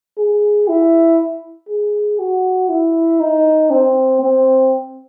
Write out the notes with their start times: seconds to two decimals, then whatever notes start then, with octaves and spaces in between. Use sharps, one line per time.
0.18 G#4
0.68 E4
1.69 G#4
2.19 F#4
2.69 E4
3.20 D#4
3.71 C4
4.21 C4